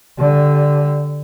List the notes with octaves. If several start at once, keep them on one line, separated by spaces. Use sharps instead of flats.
D3 G3